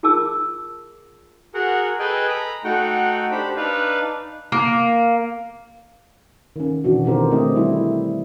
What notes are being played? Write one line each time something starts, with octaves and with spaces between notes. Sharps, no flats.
F4 G#4 A#4 A5 D6 E6
F#4 G#4 A#4 F#5
G#4 A4 B4 D#5 G5 G#5
A#5 B5
A3 D#4 F#4 F#5 G5
D4 G4 C5 B5
D4 D#4 B4 D5 F5
A#3
D#3 C#4
B2 E3 D4 F#4
D3 D#3 C4 G4 A#4 C5
A3 C4 E4 G4 D#5
G3 E4 C5